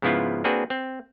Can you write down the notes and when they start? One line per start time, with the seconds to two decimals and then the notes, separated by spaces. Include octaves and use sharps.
0.02 G#2 C#3 F3 B3 E4 F4
0.44 A#3 C4 D4 F#4 G#4 B4
0.70 C4